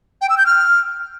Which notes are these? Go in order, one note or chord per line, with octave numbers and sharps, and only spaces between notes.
G5
E6
G6
F6